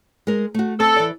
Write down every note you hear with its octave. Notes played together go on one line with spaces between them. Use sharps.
G#3 A#4
A3 F#4
C4 A4
E3 D5